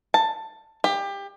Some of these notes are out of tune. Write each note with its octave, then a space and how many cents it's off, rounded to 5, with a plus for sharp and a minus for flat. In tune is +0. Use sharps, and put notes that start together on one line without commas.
A5 +10
G4 +25